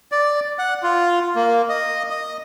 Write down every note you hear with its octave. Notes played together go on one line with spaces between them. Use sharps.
D5
F#5
F4
A#3
D#5
D#5